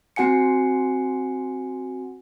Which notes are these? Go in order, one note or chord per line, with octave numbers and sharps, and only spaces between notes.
C4 F#4 F#5 G#5 C#7